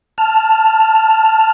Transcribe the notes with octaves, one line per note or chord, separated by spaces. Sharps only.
A5 F6